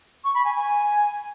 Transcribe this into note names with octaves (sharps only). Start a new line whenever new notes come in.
C#6
B5
G#5
G#5